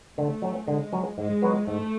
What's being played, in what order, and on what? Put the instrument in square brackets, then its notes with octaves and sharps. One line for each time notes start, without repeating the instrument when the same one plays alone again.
[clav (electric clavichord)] D3 [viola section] A3
[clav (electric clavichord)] F#3 C#4
[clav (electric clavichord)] D3 [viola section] G#3
[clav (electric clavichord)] F#3 C#4
[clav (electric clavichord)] G#2 [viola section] G#3
[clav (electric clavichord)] F#3 B3 F#4 B4
[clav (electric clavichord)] G#2 [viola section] A3